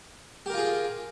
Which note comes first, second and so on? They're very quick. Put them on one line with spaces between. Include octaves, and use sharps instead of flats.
G4 A#4 F4 G#4